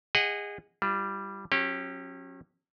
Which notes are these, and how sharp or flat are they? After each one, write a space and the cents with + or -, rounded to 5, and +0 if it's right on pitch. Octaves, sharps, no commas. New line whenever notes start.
G#4 -25 D#5 +0 F#5 +5
G3 +0 F4 -40
F#3 -35 C#4 -30 G4 +0